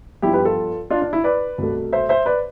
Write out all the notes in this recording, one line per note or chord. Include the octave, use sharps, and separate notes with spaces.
G2 F3 B3 E4 G4
G4 B4
F4 A4
D4 F4
D4
E4
B4 D5
C2 B2 A3
C5 E5
C5 E5
B4 D5